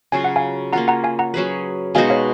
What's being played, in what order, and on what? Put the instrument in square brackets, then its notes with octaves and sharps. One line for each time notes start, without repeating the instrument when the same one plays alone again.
[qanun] C#3 F#3 C#4 F4 [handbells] G#5
[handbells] F#5
F5 G#5
[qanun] A#3 C#4 F4 [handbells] F#5 A#5
[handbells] F#5 A#5
F5 G#5
F#5 A#5
[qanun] F#3 C#4 G#4 B4
[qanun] B2 G#3 D#4 F#4 [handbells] F5 G#5
[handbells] C#5 F5